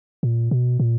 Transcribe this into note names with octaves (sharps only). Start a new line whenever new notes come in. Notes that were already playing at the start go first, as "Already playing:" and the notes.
A#2
B2
A#2